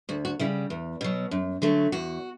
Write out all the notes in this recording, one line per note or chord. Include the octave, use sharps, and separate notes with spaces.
D2 F#4
F#4
C#3 G3 E4
E2
B2 F#3
F#2
D3 F#3 A3
E2 F#4